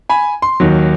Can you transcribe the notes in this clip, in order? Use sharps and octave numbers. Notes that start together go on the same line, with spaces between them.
G#5 B5
C6
D#2 D#3 F#3